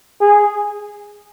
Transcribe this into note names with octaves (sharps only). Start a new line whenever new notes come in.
G#4